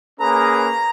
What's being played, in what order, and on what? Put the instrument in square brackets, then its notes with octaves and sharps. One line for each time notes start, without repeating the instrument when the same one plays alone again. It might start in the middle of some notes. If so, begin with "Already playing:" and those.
[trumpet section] A#3 C#4 G#4 B4 [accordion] A#5